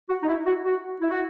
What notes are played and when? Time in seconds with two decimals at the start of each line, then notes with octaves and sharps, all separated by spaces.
0.10 F#4
0.23 D#4
0.28 E4
0.46 F#4
0.65 F#4
1.02 E4
1.11 F#4